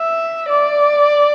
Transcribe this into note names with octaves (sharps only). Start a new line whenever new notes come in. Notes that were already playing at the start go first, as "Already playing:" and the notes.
Already playing: E5
D5